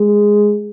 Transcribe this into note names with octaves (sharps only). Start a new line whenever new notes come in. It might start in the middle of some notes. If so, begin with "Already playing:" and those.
Already playing: G#3